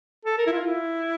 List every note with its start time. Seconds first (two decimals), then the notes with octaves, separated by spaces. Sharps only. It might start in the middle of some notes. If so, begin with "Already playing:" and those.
0.25 A4
0.38 A#4
0.46 E4
0.52 F4
0.66 E4